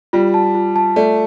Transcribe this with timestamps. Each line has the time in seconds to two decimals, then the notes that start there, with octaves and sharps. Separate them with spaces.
0.13 G3 F4
0.34 A5
0.55 F4
0.76 A5
0.96 A3 D5